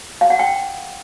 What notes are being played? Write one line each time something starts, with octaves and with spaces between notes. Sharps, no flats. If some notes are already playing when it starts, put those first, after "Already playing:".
F5
F#5
G5